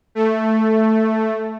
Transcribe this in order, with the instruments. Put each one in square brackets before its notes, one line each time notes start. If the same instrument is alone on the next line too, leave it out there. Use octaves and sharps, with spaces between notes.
[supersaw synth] A3